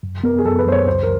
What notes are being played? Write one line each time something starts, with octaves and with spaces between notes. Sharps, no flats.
F#2
B3 A#4
G#4
F#2 A4
B4
F#2 C5
C#5
C#2 C5
A#4